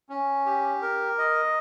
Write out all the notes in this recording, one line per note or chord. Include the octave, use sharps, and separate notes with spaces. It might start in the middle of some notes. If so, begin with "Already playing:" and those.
C#4
G4
A#4
D#5